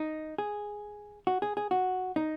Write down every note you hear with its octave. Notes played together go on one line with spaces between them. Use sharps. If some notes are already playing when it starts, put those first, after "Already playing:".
Already playing: D#4
G#4
F#4
G#4
G#4
F#4
D#4